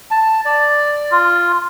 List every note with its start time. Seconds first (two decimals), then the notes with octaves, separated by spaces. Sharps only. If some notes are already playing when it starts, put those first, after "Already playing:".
0.11 A5
0.45 D5
1.11 F4